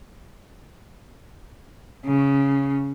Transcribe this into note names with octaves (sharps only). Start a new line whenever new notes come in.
C#3